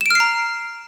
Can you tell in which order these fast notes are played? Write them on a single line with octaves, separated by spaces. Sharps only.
E7 D7 F6 C7 A#5